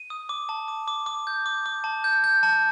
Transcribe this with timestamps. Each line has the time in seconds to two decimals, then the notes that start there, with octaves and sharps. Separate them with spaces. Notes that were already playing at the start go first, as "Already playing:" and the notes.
Already playing: D#7
0.10 D#6
0.29 D6
0.49 A5
0.68 D6
0.88 D6
1.06 D6
1.27 G6
1.46 D6
1.66 D6
1.84 A5
2.04 G6
2.24 G6
2.43 A5